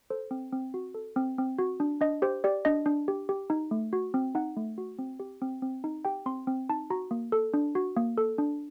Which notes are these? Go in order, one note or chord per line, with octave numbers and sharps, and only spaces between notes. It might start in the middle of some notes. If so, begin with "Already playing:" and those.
A4 C5
C4
C4
F#4
A4
C4
C4
F#4
D4
D4 D#5
G4 C5
G4 D5
D4 D#5
D4
G4
G4
D#4
A3
F#4
C4
D#4 F#5
A3
F#4
C4
G4
C4
C4
D#4
G4 G5
C4 C6
C4
D#4 A5
F#4 A#5
A#3
A4
D4
F#4
A#3
A4
D4